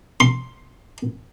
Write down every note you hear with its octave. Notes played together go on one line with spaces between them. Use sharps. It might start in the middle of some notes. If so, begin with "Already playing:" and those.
C6